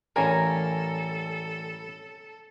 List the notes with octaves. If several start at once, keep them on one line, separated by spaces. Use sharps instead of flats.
A1 G3 C#4 A4 A#4 F5 G#5 A#5